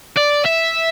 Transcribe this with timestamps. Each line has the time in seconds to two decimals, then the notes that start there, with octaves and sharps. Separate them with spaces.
0.17 D5
0.46 E5